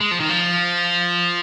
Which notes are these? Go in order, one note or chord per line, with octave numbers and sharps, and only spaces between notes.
G#3
F3
D#3
F3